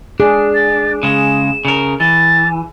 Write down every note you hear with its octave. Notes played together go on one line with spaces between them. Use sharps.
D4 G#4
A6
C#3 G#3 E7
C#3 A#4
E3 A6